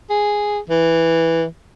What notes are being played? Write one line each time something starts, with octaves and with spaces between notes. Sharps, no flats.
G#4
E3